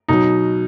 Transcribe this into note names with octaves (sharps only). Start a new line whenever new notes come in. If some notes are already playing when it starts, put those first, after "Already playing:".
B2 F#3 D#4